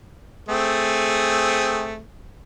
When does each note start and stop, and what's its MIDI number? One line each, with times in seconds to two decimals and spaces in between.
0.48 2.00 57
0.48 2.00 60
0.48 2.00 68